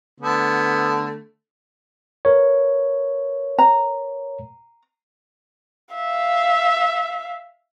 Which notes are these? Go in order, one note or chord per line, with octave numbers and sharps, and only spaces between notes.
D3 A3 B3
A#4 B4 C#5
A#5
E5 F5